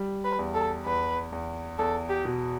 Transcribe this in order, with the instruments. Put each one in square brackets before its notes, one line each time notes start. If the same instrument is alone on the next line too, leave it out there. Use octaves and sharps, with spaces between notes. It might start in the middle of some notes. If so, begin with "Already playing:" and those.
Already playing: [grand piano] G3
[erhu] B4
[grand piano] E2
[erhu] A4
[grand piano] E2 [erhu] B4
[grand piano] E2
[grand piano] E2 [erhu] A4
[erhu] G4
[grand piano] B2